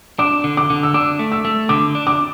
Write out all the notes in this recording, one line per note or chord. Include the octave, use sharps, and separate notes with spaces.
D4 D6
D3
D6
D3
E6
D4 D6
A3
E6
A3
D3 D6
D4
D6